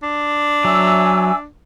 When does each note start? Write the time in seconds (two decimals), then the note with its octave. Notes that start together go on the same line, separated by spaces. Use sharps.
0.03 D4
0.65 F#3 E5 G#5 E6